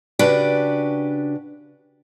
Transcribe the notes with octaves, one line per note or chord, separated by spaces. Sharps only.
C#3 D4 F#4 G4 B4 D5